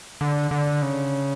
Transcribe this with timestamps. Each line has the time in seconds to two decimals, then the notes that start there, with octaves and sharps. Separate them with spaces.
0.21 D3
0.51 D3
0.82 C#3